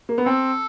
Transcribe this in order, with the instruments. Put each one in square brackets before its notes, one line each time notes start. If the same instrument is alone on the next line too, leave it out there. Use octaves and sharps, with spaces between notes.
[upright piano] A#3
B3
[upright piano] C4 [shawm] A4